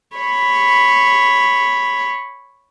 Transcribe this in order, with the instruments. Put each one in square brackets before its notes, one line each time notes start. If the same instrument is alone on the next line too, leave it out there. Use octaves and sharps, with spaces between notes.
[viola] C#5 B5